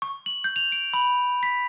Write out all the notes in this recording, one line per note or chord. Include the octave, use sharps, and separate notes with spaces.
C#6
F#7
G6
F7
D7
B5
B6